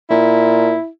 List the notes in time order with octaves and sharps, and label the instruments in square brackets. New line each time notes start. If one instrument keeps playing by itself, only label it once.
[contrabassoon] A#2 [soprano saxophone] E4